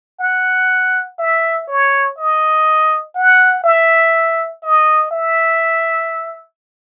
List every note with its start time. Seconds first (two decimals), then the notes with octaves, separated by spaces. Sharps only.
0.20 F#5
1.19 E5
1.68 C#5
2.17 D#5
3.15 F#5
3.64 E5
4.63 D#5
5.11 E5